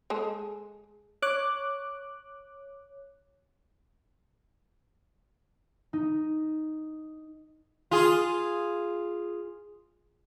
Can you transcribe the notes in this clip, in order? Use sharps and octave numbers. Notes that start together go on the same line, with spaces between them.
G#3 G#4 A4
C#5 D6 F#6
D#4
F4 G#4